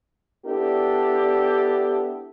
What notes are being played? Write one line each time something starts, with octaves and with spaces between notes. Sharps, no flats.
B3 D4 E4 G4 A4